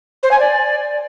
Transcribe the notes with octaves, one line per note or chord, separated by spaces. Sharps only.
C5
G#5
D5